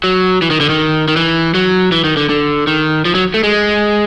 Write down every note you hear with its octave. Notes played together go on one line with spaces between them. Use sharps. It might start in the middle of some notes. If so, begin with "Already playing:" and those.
F#3
E3
D#3
D3
D#3
D#3
E3
F#3
E3
D#3
D3
D3
D#3
F3
F#3
A3
G#3